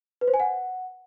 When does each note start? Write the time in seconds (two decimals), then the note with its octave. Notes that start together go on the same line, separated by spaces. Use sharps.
0.21 B4
0.27 C5
0.34 G#5
0.40 F#5